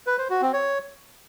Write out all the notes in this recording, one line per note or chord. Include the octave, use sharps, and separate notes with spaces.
B4
C5
F#4
C4
C#5